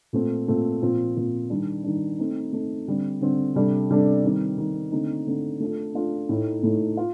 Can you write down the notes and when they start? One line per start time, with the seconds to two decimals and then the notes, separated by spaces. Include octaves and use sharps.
0.13 A#2 A3 C4
0.48 A#2 A3 C4
0.82 A#2 F3 C4
1.16 A#2 F3 C4
1.50 D#3 G3 D4
1.84 D#3 G3 D4
2.19 A3 C4 D#4
2.53 A3 C4 D#4
2.87 D3 G3 C4
3.21 D3 G3 C4
3.55 C3 G3 D4 A4
3.90 C3 G3 D4 A4
4.24 D#3 G3 C4
4.58 D#3 G3 C4
4.92 D3 A3 C4 D#4
5.27 D3 A3 C4 D#4
5.60 A3 D4 F4 A4
5.95 A3 D4 F4 A4
6.29 A2 A3 D#4
6.63 A2 A3 D#4
6.97 F4